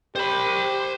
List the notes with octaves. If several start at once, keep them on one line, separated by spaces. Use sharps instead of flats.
G4 C5 B5